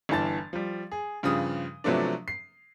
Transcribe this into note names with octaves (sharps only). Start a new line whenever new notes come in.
G1 G2 E3 A5 A6
F3 G3
G#4
G2 C#3 F3 D#6
C3 F3 F#3 A3 B3 D4
C7